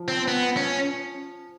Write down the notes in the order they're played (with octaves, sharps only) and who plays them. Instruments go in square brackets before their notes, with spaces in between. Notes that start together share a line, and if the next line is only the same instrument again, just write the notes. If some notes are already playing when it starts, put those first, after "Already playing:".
Already playing: [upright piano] F3
[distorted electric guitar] C4
B3
C#4